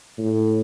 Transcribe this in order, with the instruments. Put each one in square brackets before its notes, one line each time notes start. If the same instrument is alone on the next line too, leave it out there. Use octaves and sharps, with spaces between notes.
[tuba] A2